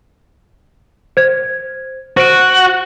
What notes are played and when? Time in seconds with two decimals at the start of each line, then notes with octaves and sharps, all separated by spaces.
1.17 C5 G#6
2.17 F#4 C5 D7